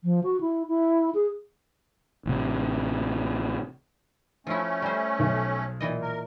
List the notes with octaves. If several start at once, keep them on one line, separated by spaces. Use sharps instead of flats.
F3
F#4
E4
E4
G#4
A1 C3
F3 A3 C#4 E4
G3 C5
B1
A#2 E3 D#5
A#4